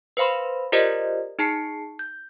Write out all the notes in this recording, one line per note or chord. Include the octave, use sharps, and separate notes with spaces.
B4 C5 F5 B5 C6
F4 G4 A#4 C5 D5 D#5
D#4 G#4 A5 C7 C#7
G6